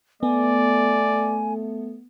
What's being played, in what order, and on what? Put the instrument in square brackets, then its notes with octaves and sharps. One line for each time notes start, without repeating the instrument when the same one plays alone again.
[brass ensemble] A3 [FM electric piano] B3 [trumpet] D5 [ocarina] G#5